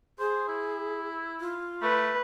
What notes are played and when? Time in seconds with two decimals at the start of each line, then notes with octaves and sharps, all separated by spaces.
0.19 G#4 C5
0.48 E4
1.40 F4
1.82 A3 B4